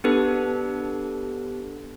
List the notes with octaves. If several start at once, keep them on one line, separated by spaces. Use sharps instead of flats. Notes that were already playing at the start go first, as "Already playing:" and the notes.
B3 D4 G4 A4 B4